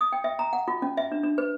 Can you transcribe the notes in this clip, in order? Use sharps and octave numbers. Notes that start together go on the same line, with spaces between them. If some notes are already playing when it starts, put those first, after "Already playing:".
D#6
G5
E5
A#5
F#5
F4
C#4
E5
D4
D4
B4